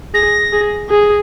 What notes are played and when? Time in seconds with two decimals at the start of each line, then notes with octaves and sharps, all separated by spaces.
0.14 G#4 A#6
0.53 G#4
0.90 G#4